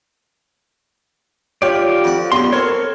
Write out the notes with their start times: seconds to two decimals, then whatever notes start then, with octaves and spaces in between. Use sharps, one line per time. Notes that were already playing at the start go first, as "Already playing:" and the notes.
1.62 F4 G4 C#5 D5
2.04 F2 F#5
2.32 B1 G2 C6
2.53 C4 A4 A#4 C#5